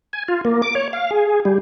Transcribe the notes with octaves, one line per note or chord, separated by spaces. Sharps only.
G#5
F4
A#3
D6
C#5
F5
G#4
G3